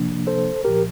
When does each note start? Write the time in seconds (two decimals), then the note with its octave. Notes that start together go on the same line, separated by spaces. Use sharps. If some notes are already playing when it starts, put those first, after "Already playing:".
Already playing: C3 F3 A#3 D4
0.27 A4 C5
0.64 C2 A#2 F3 G4 A#4